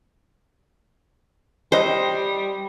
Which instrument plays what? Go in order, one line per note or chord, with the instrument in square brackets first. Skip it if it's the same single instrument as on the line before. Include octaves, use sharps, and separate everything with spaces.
[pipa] C3 D#5 [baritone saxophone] G3 [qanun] C5